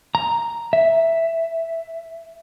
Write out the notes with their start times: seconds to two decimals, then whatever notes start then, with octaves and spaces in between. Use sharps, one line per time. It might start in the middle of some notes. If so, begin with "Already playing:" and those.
0.15 A#5
0.73 E5